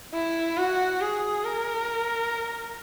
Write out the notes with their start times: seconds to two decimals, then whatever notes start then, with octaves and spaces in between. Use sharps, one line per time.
0.14 E4
0.57 F#4
1.01 G#4
1.45 A#4